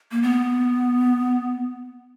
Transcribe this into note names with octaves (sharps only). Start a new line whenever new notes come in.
A#3
B3